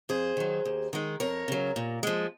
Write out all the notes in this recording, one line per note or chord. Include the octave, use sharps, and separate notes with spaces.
F2 G#4 C5
D#3 F#3
D#2
D#3 G#3
F2 A#4 C#5
C#3 F#3
A#2
F3 G#3